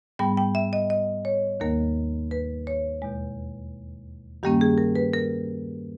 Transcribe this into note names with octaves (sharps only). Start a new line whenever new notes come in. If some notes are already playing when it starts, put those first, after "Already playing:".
G#2 G3 B3 G5
G5
E5
D#5
D#5
C#5
D#2 D#3 A#3 A#4
B4
C#5
E2 B2 G#3
G2 D#3 G3 A#3 C#4 G4
G#4
A#4
B4
A#4